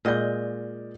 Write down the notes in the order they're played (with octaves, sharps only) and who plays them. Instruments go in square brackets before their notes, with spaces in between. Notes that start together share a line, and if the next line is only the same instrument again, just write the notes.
[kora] A#2 D#5 [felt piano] G#3 D5 G6